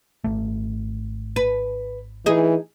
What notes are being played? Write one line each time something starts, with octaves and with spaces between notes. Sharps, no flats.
G#1 A3
B4
E3 D#4 G#4